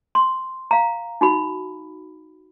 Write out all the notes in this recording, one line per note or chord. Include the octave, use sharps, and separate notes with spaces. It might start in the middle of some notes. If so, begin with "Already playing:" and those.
C6
F5 A#5
D#4 F#4 B5